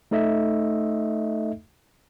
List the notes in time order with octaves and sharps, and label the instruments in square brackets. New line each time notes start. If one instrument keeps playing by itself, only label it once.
[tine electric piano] A3 D#4 A4 D#5 E5